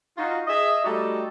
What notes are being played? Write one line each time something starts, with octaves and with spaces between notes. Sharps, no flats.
D#4 F4 F#4
G#4 D#5 E5
G3 A3 D#4 F#4 A4 D5